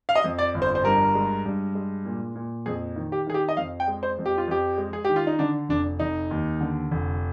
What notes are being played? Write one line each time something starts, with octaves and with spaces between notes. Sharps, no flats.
F5
D#5
F2
D5
G1
C5
C5
G2 A#4
G#3
G2
G#3
A#2
A#2
F2 G#4
D#3
G4
D#3 G#4
G4
D#5
F2 F5
G5
G#3
C5
F2
G4
F4
F2 G4
G#3
G#4
D#3 G4
F4
D#4
D3 D4
F1 D4
F1 D#4
D#2
D3
F1